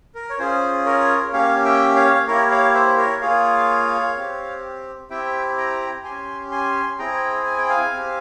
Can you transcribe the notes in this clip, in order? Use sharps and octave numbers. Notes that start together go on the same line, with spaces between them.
A#4
C#5
C#4 F4 G#4 C5
A#4 C#5
A#3 C#4 G4 C#5 F5
E5 G5
C#5 F5
A#3 E4 G4 A#4 C#5
C#5 F5
C5 E5
A#4 C#5
A#3 F4 G#4 C#5 F5
C4 G4
C4 E4 G4 E5 G5
G5 A#5
C#4 G4 G#5 C6
G#5 C6
C4 E4 G#4 G5 A#5
G#5
G5
F5 G#5
C4 G4